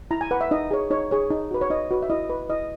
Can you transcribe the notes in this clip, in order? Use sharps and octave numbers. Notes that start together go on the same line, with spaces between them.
E4 A#5
G#5
B4 F#5
E5
D#4 D#5
G#4 C#5
D#4 C#5
G#4 C#5
D#4
F#4 B4
C#5
D#4 D#5
F#4 B4
E5
E4 D#5
B4
E4 D#5